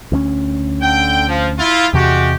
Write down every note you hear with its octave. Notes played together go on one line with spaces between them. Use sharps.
D2 A#3 C#4
D3 G5
F3
E4 F4
E2 C3 G#3 F#4 G4